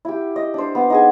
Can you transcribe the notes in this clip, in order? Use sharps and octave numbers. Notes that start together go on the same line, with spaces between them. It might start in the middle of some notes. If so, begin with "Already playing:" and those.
E4 G4
D#5
D4 C5
B3
D#4 G#4 G#5